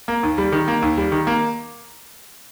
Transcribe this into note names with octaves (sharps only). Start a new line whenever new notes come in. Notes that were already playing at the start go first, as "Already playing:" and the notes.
A#3
D#2
G3
D#3
A#3
D#2
G3
D#3
A#3